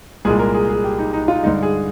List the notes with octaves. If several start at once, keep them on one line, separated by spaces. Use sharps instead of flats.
C2 A#2 G#3 G#4
A#4
G#4
G#4
G4
D#4
D#4
F4
G2 D3 G#3 D#4
G#4